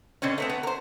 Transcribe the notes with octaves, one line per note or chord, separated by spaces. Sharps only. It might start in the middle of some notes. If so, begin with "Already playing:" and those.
B2 D3 C4 C#4
A3 B3 C4
B3
A#4 C5